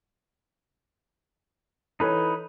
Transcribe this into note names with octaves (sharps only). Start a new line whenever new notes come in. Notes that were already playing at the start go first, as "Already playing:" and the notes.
E3 D#4 A4 B4 C#5